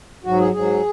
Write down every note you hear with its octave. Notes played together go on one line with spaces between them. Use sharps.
G#2 F#3 F#4
G#4
G#2 F#3 G#4